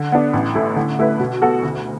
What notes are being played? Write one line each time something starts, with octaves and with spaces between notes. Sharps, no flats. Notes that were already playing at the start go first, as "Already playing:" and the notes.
Already playing: D3
B3 D4
A1
A2 A3 E4
D3
A3 E4 B4
B2
B3 F#4 A4
D2